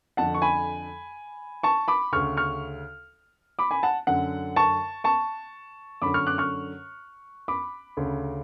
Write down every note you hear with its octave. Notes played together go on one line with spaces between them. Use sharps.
F2 D3 F#5 A5
C#6
G#5 B5
A5 C#6
B5 D6
D2 C#3 C#6 F6
C#6 F6
B5 D6
G#5 B5
F#5 A5
F#2 D3 F#5
A5 C#6
A5 C#6
F#2 D3 B5 D6
C#6 F6
D6 F#6
C#6 F6
B5 D6
D2 C#3